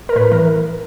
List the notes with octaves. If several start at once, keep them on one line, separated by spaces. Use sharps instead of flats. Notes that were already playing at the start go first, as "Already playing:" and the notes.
A#4
A2 B4
E3 A#4